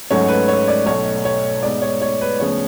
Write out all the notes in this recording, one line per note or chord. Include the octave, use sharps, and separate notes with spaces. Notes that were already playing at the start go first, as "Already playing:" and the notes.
G#2 F#3 A3 C#4 C#5
B4
C#5
D5
B1 B2 A3 C#5
C#5
G#2 G#3 B3 D5
C#5
C#5
B4
D2 C#3 F3 B3 C#5